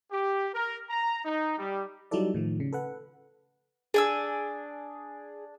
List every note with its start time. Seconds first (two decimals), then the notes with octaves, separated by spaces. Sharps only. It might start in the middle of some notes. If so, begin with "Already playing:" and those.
0.11 G4
0.54 A#4
0.90 A#5
1.25 D#4
1.58 G3
2.11 F#3 G3 D#4 E4 A4 D5
2.34 A2 D#3 F3
2.60 C#3
2.73 A4 B4 F#5
3.94 D4 G#4 G#5 E6